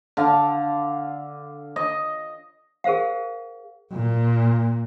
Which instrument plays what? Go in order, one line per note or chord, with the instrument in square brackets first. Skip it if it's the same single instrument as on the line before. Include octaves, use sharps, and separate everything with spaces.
[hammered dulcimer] D3 F5
D#5
[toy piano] G#4 A#4 C5 F5 F#5
[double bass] A#2